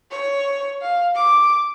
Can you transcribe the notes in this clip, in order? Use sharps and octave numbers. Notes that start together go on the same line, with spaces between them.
C#5
F5
D6